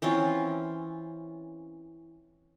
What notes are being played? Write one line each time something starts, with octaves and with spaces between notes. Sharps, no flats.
E3 C4 C#4 F4